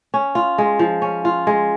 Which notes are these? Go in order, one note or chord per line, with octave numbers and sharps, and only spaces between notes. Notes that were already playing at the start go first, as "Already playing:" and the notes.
C#4
F4
G#3
F3
C#4
F4
G#3